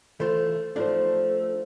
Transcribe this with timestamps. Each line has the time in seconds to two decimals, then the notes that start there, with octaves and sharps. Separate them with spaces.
0.20 E3 A3 F4 C5
0.76 F3 A3 D4 D#4 C5